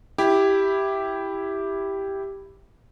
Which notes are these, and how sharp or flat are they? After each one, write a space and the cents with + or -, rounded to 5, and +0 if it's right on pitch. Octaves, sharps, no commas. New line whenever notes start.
E4 +0 G4 +0